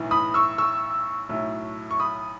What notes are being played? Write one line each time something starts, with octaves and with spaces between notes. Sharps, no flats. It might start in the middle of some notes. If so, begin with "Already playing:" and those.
Already playing: B1 A2 E3
B5 D#6
C#6 E6
C#6 E6
B1 A2 F#3 A3
C#6
B5 D#6